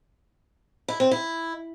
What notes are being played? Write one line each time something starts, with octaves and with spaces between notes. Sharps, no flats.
E4
C4
E4